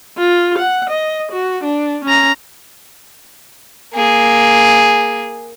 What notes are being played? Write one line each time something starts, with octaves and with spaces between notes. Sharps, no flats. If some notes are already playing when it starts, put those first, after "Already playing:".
F4
F#5
D#5
F#4
D4
C#4 A#5
A#3 G#4